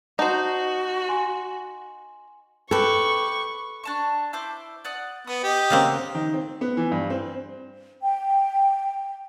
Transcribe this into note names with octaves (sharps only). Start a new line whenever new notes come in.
D#4 F#4 C5 F#5 A5
G#5 C6
G4 A4 B4 C#6
D4 A5 C#6
E4 C5 D6
D5 F#5 D#6
B3 D#6
G4 D#5
C#3 A#3 C4 F#4
D#3
C4
B3
E3
G2
C4
G5